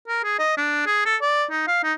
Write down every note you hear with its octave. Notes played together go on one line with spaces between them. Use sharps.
A#4
G#4
D#5
D4
G#4
A4
D5
D#4
F5
D#4